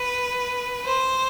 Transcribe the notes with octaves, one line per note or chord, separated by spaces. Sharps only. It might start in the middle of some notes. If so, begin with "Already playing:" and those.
Already playing: B4
C5